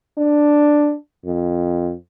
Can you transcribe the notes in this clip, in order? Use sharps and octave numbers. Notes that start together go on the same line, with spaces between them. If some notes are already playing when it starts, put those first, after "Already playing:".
D4
F2